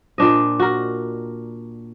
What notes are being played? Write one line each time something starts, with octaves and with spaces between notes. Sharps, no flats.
A#2 D4 D#5
F#4 A#4